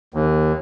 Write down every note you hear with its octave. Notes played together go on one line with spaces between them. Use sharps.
D#2